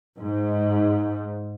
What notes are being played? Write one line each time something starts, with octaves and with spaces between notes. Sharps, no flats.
G#2